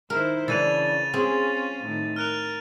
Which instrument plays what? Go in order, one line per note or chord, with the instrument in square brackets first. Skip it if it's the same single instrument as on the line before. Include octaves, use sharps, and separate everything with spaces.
[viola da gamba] D#3 E4 C5 [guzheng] A#4
[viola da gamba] C#3 [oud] E3 D4 B4 [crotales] A6 D#7 F7
[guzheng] C4 [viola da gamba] C#4 F4 [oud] G#4
[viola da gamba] A2 D#3
[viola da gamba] A#4 [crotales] F6 F#6 F7